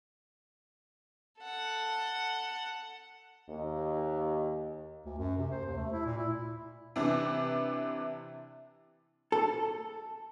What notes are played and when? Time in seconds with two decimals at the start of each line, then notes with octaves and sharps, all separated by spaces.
1.40 A4 F#5
3.49 D#2
5.06 D2
5.19 F#2
5.37 C3
5.51 C5
5.65 D#2
5.77 A3
5.93 E4
6.06 A#2
6.18 E4
6.96 C3 E3 D4
9.32 A4